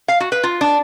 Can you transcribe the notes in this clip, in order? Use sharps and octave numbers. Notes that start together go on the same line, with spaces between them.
F5
F#4
B4
F4
D4